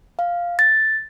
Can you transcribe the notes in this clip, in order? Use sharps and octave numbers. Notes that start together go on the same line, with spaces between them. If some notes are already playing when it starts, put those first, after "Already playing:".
F5
A6